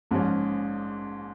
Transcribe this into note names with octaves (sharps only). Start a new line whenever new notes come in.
A#1 G#2 F3 G#3 C#4